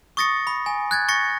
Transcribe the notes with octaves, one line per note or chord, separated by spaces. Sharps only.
C#6 D#6 A6 A#6 C#7
B5
G#5
F#6 G#6 A6
C#6 A6 A#6 C#7